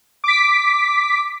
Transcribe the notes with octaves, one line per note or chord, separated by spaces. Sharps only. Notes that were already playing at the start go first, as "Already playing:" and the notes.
D6 B6